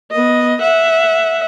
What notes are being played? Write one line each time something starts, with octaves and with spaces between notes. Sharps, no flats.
B3 D#5
E5 F#5